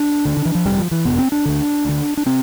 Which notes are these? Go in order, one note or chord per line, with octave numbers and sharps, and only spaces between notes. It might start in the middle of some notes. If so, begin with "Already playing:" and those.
Already playing: D4
D2 D3
D3
E3
F3
G1 F2 C3 G3
F3
E3
G1 F2 C3 B3
C4
D4
D2 D3
D2 D3
D4
C3 C4